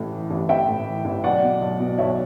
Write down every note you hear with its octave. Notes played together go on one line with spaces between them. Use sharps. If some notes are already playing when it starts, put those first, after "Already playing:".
Already playing: A1 A2
E3
A1
A1 E5 G5
A2
E3
A1
B1 D5 F#5
B2
B1
B2
B1 C#5 E5